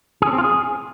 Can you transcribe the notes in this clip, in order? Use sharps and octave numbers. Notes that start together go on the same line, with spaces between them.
G#4
C#4
C4
F4
G#4